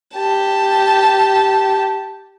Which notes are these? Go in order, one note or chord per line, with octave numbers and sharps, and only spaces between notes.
G4 A5